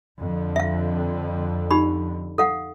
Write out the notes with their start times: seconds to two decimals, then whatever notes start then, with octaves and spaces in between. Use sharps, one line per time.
0.19 F2 D3
0.56 E5 F5
1.71 D#4 G4 B5
2.38 A4 F5 F#5